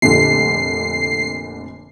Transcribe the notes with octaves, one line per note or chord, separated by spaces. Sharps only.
F1 A#2 D3 C7